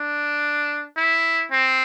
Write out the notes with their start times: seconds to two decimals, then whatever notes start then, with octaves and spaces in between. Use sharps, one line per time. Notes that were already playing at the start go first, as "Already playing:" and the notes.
Already playing: D4
0.97 E4
1.51 C4